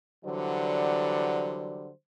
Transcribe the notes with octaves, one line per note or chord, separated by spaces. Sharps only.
D3 E3 F#3 G3 C5 D5